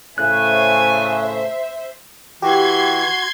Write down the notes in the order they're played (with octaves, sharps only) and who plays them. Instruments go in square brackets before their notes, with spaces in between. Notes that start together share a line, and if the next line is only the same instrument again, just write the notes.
[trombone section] A2 C#3 A3 [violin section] C5 E5 [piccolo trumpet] G#5 [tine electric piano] F#6
[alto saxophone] E3 [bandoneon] F#4 [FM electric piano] G4 [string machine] C6 G#6